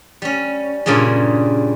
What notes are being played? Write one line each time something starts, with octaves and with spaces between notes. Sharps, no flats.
G3 C#4
G2 A#2 C#3 G3 G#3